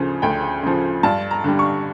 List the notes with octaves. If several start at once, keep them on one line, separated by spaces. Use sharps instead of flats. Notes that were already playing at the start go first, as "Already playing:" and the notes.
Already playing: D2 C#3 F3
D2 G5
C#3 F3
G2 A5
A#5
D3 G3
C#6